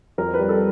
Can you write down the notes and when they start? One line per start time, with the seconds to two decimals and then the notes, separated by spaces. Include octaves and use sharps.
0.18 F2 A#4
0.34 G3 B4
0.49 A4